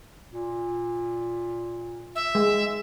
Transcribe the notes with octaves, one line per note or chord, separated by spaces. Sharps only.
A#2
E5
G#3